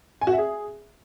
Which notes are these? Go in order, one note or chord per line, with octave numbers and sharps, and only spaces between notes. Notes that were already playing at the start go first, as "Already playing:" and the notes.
G#5
F#4
E5
G#4